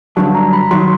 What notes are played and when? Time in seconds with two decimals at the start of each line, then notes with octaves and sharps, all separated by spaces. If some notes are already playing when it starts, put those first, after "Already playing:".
0.16 G2 D3 F#3 A5
0.34 A#5
0.53 B5
0.71 D#3 F#3 C6